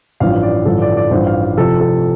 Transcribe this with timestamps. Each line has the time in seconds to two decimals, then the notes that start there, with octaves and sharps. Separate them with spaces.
0.20 A1 G2 F3 F5
0.43 D5
0.65 A1 G2 D3 F3 A4
0.82 D5
0.97 D5
1.11 A1 G2 F3 C5
1.27 F5
1.42 D5
1.57 F1 F2 C3 F3 A4
1.80 A4